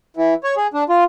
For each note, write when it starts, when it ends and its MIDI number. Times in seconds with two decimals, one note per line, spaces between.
0.17 0.34 52
0.44 0.55 73
0.56 0.67 68
0.74 0.84 62
0.89 1.04 65